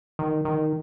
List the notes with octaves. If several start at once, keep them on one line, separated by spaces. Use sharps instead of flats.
D#3
D#3